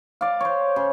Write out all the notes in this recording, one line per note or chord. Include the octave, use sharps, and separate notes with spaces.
D5 F5
C5 C#5
C#3